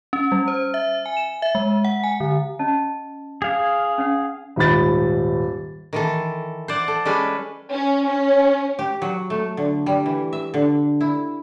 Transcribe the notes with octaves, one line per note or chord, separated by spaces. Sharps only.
C#4
G3
C5
E5
G#5
E7
E5
G#3
F#5
G#5
D3
C#4 D#5 A5
G#4 F5
C#4 F#5
D#1 G#2 B5 A6
D#3 E3 A4
C5 D5 F#5
A4
G3 G#3 C#4 A4 B4
C#4
C#4
G4
F#3
A3
D3
G3
E3
E5
D3
E4